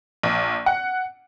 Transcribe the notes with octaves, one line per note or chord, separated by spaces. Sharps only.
A#1
F#5